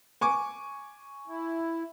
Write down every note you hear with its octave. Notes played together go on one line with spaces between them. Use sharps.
G#5 C#6 D6
E4